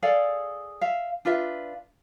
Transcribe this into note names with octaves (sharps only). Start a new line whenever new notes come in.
G#4 A4 D5 F5
E5 F5
D4 F4 B4 E5